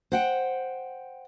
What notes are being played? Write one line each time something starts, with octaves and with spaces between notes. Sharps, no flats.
C5 F#5 G5